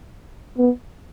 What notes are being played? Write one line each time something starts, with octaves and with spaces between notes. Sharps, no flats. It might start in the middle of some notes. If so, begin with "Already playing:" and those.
B3